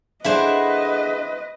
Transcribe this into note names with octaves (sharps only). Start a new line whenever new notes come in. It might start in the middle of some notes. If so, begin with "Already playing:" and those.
D4 E4 G#4 A4 B4 C5 D#5 F#5